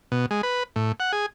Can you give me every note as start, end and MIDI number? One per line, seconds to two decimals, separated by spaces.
0.12 0.26 47
0.31 0.42 56
0.43 0.63 71
0.76 0.92 45
1.00 1.12 78
1.13 1.26 68